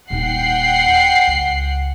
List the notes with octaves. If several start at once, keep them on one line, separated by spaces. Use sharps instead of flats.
D#1 D#4 F#5 G5 C7
C#2